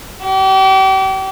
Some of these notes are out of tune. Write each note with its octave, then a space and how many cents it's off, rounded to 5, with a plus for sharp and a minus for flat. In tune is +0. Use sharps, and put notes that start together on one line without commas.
G4 -35